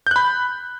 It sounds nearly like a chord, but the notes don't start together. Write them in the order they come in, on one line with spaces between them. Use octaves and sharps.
G6 F#6 B5